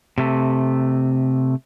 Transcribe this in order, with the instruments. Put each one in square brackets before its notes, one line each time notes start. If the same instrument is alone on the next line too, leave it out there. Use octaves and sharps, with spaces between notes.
[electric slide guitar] C3 A3